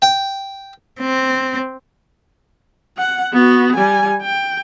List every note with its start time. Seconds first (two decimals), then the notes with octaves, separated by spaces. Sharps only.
0.02 G5
1.01 C4
2.98 F#5
3.33 B3 F#4
3.76 G3 G#5
4.22 G5